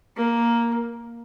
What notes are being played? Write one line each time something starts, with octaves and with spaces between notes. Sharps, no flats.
A#3